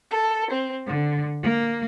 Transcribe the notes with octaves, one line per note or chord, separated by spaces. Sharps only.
A4
C4
D3
A#3